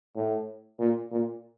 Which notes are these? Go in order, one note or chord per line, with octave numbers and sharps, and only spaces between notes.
A2
A#2
A#2